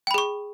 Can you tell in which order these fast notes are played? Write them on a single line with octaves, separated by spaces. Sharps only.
G5 B5 G#4 C#6